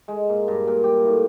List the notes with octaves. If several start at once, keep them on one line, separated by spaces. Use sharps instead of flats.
G#3
A#2
G2
A#2
G4
A2